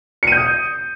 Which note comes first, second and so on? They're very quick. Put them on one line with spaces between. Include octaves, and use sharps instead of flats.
C#7 D#7 G6 D#6